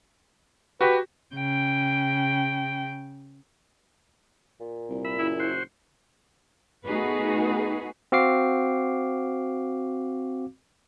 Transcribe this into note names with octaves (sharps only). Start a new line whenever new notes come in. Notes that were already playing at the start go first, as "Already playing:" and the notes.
F#4 G4 B4
C#3 G5
A#2
C2
E5 B5
F#1 E4
F#4 C5
A3 B3 D#4 F#4 G#4 B4
C4 F#4 F5 D6 C7